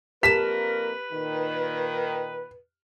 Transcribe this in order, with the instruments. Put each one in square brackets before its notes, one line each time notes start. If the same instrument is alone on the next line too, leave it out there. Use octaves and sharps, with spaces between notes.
[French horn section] F2 A#3 A#4 [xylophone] G4 A5 E7 [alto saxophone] B4 [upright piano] B6
[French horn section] A#2 D#3